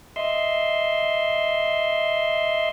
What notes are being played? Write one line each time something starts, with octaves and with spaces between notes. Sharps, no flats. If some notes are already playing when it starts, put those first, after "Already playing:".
D#5 E5 C6